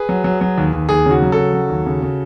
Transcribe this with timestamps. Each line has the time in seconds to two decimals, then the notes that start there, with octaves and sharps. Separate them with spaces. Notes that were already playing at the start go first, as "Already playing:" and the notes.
Already playing: G#4 B4
0.09 F#3
0.24 F#3
0.41 F#3
0.58 D#2
0.73 D#2
0.89 D#2 G#4
1.06 C#3 F#4
1.22 F#3
1.32 C#3 F#4 A4
1.54 F#3
1.70 D#2
1.86 C#3
2.02 C#3